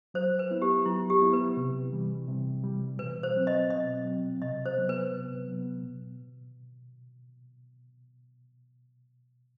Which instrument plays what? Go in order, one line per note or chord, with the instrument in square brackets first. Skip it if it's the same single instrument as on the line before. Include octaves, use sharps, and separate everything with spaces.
[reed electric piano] F#3 [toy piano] C5
[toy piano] B4
[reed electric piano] B3 E4
[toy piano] G4
[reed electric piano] F#3 [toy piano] E4
[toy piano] G4
[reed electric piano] B3 E4
[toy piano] B4
[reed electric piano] C3
E3 G3
C3
E3 G3
[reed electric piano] B2 [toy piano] B4
[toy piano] C5
[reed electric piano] F#3 C4
[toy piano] D#5
[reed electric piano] B2 [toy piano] D#5
[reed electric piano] F#3 C4
[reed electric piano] C3 [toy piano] D#5
[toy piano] C5
[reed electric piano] F#3 B3
[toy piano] B4
[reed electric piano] C3
F#3 B3
B2